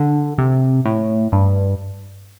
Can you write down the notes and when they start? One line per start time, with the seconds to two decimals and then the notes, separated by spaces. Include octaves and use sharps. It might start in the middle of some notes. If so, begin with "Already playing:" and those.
Already playing: D3
0.38 C3
0.85 A2
1.32 G2